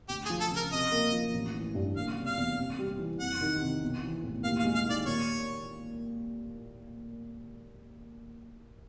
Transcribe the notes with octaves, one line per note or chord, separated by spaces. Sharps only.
D2 G4
G#4
F3
A4
C#3
A#4
C3 D#5
A#3
F3
A1
E3
G2
F#1 F5
C3
F5
E2
C3
G3
E3
F2 F#5
D#3
C3
B1
E3
A2
D#2 F5
F5
G#3
F5
D#3 D5
A#2 C#5